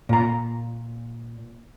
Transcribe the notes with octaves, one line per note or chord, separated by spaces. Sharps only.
A#2 A#5